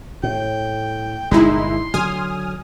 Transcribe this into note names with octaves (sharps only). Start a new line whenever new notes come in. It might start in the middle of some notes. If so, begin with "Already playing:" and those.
A2 G5
G1 A#2 G#3 D#4 E4 C6
D3 F#3 G#5 D#6 F6